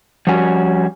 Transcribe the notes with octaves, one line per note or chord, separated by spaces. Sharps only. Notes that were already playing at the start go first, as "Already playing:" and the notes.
F3 G3 C#4 F#4 G#5